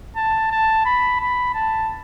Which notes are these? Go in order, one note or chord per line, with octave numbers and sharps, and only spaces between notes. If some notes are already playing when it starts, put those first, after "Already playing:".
A5
A5
B5
B5
A5